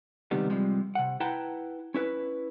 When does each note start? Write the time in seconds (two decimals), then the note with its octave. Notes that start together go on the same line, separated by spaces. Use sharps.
0.31 C#2 C3 D#3 G3 B3
0.50 C3 F3 G3 G#3
0.95 C3 F#5
1.20 E4 B4 F#5 G5 A5 A#5
1.94 C#4 E4 B4